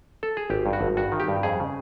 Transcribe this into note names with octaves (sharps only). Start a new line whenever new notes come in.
A4
G#4
G#1 G4
G2
F#4
G#1
G2 F#4
D#3
G4
G2
F2 G#4
C#3